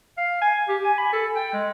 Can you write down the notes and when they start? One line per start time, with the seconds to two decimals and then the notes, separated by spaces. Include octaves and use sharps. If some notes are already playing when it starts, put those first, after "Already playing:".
0.18 F5
0.41 G#5
0.69 G4
0.84 G#5
0.98 B5
1.12 A4
1.36 G5
1.53 G#3